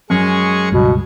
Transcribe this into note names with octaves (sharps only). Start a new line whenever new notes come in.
F#2 G#3 G#4 C#6
C#2 G2 B2